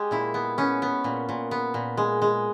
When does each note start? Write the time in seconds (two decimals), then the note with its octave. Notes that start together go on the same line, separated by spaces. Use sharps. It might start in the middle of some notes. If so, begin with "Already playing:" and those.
Already playing: G#3 G4
0.11 A#2 E4
0.34 B3
0.58 B3 C#4
0.82 B3
1.04 A#2
1.29 A#2
1.51 B3
1.74 A#2
1.97 G#3
2.22 G#3